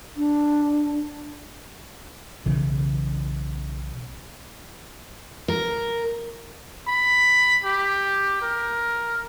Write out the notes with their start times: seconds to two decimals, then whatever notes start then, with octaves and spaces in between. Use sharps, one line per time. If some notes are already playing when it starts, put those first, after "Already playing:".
0.17 D4
2.46 B1 C#3 E3
5.48 A#4
6.88 B5
7.64 G4
8.42 A#4